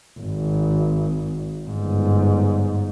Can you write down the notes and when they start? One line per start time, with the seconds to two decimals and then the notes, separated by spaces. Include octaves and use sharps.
0.20 G#1
1.69 G1 G#2